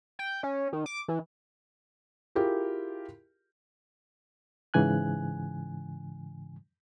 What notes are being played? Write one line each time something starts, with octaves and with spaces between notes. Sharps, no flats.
G5
C#4
D#3
D6
E3
E4 F4 G4 G#4 A#4
G#2 C#3 E3 G#5 F#6